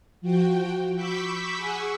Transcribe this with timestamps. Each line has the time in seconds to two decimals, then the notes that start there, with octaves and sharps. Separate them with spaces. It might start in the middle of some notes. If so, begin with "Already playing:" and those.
0.21 F3 F#4 G5
0.95 B5 C#6 D6 E6 G6 B6
1.57 G#4 F#5 G#5 C#6 E6